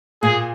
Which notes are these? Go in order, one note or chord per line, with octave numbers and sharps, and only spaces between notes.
A#2 G#4